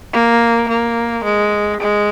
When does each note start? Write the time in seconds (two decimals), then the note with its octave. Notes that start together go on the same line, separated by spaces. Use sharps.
0.13 A#3
0.69 A#3
1.24 G#3
1.81 G#3